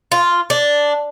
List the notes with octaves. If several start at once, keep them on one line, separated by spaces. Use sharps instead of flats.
F4
D4